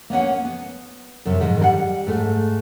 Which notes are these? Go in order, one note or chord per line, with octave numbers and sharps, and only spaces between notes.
A#3 B3 C#4 F#5
B3
F#2 C3
G#2 D#3
G3 A#4 F#5
G#2 A3